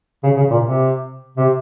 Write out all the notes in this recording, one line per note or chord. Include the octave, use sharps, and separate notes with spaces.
C#3
C#3
A#2
C3
C3